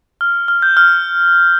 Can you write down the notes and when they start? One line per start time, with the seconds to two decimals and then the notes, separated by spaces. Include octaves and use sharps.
0.21 F6
0.48 F6
0.62 G6
0.77 F6